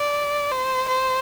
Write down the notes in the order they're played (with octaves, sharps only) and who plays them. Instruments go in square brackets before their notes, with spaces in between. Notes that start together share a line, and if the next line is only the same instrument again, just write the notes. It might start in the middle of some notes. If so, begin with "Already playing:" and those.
Already playing: [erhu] D5
C5
C5